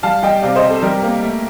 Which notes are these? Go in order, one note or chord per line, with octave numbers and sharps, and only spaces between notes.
G3 F5 A5
G3 D#5 G5
C3 D5 F5
C5 D#5
C3
A4
G3 G4 A#4
A#3
A3